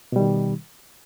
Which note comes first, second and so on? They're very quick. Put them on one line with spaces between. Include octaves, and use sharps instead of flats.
B2 G3 D#3